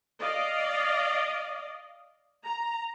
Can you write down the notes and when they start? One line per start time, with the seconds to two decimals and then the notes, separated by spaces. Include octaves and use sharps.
0.20 D5 D#5 F5
2.44 A#5